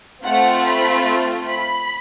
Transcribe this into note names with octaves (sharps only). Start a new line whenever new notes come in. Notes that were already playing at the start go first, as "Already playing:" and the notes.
A3 C4 F4 F#5
B5
B5